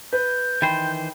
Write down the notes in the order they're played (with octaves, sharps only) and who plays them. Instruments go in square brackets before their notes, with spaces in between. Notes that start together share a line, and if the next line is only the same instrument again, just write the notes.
[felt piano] B4 [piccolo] G6
[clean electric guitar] D#3 E3 C5 [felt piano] G5 B5